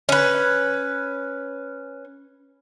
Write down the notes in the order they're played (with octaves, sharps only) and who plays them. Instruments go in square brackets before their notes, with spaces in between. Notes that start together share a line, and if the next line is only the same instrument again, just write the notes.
[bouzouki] C#4 B4